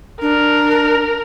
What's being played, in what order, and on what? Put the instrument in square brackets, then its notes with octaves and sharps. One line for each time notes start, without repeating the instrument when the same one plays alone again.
[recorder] D4 [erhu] A#4